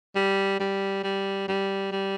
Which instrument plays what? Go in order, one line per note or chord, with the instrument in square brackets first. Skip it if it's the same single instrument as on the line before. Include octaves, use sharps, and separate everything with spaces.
[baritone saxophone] G3
G3
G3
G3
G3